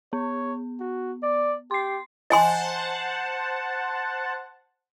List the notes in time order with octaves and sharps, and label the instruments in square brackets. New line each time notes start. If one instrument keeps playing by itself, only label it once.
[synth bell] B3 [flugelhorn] C#5
[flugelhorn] F#4
D5
[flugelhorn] G4 [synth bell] C6 C7
[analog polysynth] C5 F#5 A5 [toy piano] D#5 G#5 C6